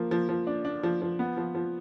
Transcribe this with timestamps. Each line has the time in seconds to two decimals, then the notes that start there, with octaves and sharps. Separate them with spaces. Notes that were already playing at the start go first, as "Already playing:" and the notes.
Already playing: F3 A#3
0.11 F3
0.29 F3
0.47 D4
0.65 D4
0.83 F3
1.02 F3
1.19 B3
1.37 F3
1.55 F3